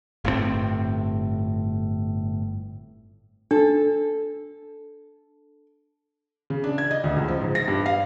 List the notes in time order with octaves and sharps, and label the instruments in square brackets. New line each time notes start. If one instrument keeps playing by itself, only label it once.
[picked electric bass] G1 A2 D3 C4
[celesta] D4 [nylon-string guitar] A4
[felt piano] C#3
D4
G#6
D#5
D2
C#2
F3
G#2
A#6
G2
F5